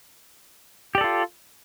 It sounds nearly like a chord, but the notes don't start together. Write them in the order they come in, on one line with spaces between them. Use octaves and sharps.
G4 D5 A4 F4